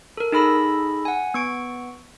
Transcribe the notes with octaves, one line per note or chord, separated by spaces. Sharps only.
A4 A#4
D#4 G#4 A4 B5 E6 A#6
F#5 G#5
B3 C#6 D7